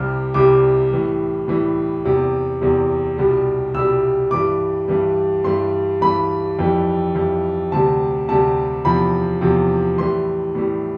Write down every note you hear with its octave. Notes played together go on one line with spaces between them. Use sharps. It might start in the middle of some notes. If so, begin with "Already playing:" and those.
Already playing: C2 C3 G3 F6
C2 C3 G3 D6
A2 E3 G3
A2 E3 G3
E2 C3 G3
E2 C3 G3
C2 B2 G3
C2 B2 G3 E6
G2 E3 G3 D6
G2 E3 G3
G2 E3 G3 C6
G2 E3 G3 B5
F2 E3 G3
F2 E3 G3
D2 C3 G3 A5
D2 C3 G3 A5
E2 C3 F3 B5
E2 C3 F3
A2 E3 G3 C6
A2 E3 G3